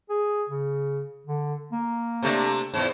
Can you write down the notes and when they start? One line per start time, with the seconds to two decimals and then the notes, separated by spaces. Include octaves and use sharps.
0.10 G#4
0.50 C#3
1.27 D3
1.72 A#3
2.23 C3 A3 D4
2.74 E2 G#2